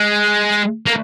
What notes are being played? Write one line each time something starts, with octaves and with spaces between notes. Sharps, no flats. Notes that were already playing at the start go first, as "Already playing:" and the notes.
Already playing: G#3
A#3